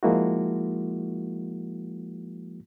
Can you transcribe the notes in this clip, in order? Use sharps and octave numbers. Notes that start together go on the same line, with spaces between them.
F3 G#3 A#3 E4 F#4